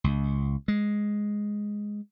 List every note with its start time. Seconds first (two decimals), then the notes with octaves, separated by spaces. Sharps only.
0.04 C#2
0.68 G#3